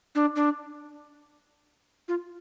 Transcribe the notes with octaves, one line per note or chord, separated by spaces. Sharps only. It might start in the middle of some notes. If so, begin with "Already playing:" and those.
D4
D4
F4